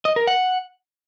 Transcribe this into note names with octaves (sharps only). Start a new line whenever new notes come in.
D#5
A#4
F#5